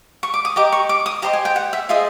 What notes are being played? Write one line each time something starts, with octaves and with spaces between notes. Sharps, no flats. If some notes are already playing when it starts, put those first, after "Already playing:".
C#6
D6
D#6
G4 A#4 D#5 D6
C#6
D6
D#6
G4 C5 D#5 A#5
G#5
G5
F#5
E5
F4 G#4 C5 D#5 E5